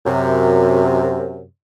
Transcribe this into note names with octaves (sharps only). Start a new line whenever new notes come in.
F#2 C3